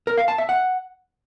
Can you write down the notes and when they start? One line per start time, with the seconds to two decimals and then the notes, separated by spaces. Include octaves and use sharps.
0.07 A#4
0.18 F5
0.28 A5
0.38 E5
0.49 F#5